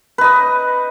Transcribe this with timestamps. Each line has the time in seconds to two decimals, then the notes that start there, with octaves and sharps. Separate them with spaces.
0.18 B4
0.21 D#4
0.24 D#5